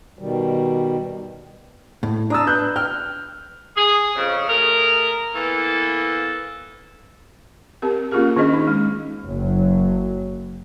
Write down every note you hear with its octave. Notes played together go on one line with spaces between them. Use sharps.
B2 D#3 G3
A2
D4 A5 A#5 D#6 E6
B4 F#6 G6
G5 F6
G#4
F2 C#3
A3 G#4 A#4
E3 A#3 B3 A4
C4 G4 A#4
A#3 C#4 F4 G4 G#4 A#4
D#3 C#4 D4 G#4 D#5
D#4
G#3
F#1 F#3